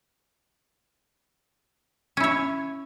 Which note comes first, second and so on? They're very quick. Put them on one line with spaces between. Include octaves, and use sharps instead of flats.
C#4 E4 C#5